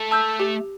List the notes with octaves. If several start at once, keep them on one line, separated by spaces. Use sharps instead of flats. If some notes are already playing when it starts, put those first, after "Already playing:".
Already playing: A3
A5 E6 G6
G4